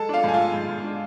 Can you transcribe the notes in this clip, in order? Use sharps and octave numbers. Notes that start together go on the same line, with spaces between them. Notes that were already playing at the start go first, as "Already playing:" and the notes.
Already playing: G#3 A4 A5
D4 F4 F5
G#2 G#5
F4 F5
G#2
G#2
G#2
D4